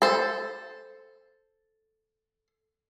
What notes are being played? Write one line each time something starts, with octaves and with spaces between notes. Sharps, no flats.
A4 C5